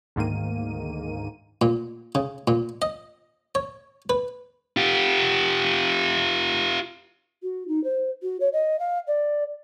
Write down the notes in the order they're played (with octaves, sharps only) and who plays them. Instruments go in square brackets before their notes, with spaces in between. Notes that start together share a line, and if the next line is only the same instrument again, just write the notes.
[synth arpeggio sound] D2 G#2 D#3 A#3 D#7
[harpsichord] A#2
C#3
A#2
D#5
C#5
B4
[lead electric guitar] F4 G4
[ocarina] F#4
D#4
C5
F#4
C#5
D#5
F5
D5